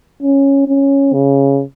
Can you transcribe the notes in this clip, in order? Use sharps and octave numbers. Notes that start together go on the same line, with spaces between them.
C#4
C#4
C#3